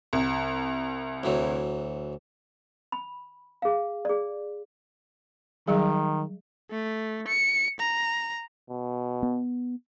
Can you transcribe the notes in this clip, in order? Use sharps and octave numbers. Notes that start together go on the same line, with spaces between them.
C2
D2 E3 F#3
B5
G#4 F5
G#4 D5
D#3 F#3 G3 G#4
A3
C#7
A#5
B2
B3